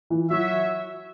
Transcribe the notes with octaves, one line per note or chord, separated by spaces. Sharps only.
E3
F#3 F#4 C#5 E5